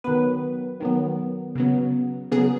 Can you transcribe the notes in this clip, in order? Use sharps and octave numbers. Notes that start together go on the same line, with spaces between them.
D#3 F#3 B3 B4
D#3 F#3 B3
C#3 F#3 B3
C#3 F#3 B3 G#4